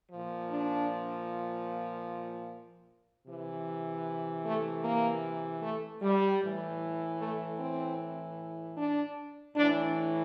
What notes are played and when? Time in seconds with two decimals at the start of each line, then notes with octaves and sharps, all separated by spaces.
0.11 A#2 F3
0.51 D4
3.26 C3 E3
4.44 A3
4.83 A#3
5.62 A3
6.02 G3
6.41 A2 E3
7.20 A3
7.59 C4
8.77 D4
9.56 A2 E3 D4